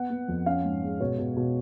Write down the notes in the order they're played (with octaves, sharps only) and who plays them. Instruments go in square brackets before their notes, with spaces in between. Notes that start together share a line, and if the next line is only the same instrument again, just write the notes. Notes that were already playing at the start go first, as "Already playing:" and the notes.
Already playing: [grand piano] B3 F#5
B3
F2
C#4 F5
G#2
G#3
B2 C#5
B2
B2